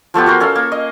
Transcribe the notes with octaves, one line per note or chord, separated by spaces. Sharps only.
F3 A3 B3 G4
F#4 A#4 C5
C#4 A4 F5
A#3
D#5